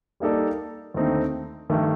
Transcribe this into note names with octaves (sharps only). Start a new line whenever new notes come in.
G3 A#3 D#4 A4 D5
D#2 D3 A3 C4 D#4
G2 D#3 A3